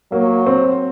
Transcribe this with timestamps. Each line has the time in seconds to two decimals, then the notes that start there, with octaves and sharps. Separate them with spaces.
0.12 F#3 A#3
0.47 C4